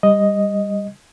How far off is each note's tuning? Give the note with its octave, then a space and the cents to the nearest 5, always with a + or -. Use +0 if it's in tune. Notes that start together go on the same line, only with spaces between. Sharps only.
G3 +20 D#5 +0